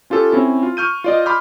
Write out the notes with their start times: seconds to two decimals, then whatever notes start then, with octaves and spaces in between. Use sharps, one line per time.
0.10 C#4 F4 G4 A4
0.32 C4 C#4 E4
0.63 F4
0.77 C#6 F6 G6 D#7
1.04 F4 D5 D#5
1.26 B5 C6 D6 F6 G6